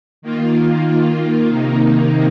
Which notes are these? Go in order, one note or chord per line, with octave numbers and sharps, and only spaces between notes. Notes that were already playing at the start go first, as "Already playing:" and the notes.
D#3 A#3 F4
C3 D#3 A#3 D#4